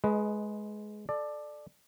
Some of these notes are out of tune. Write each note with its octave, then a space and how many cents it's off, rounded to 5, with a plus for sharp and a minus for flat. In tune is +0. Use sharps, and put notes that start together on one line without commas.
G#3 +20 B4 +0 D#5 +0
A4 -15 D5 +20